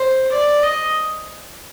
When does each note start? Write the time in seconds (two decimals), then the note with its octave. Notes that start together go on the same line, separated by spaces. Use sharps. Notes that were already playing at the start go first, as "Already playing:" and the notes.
Already playing: C5
0.32 D5
0.63 D#5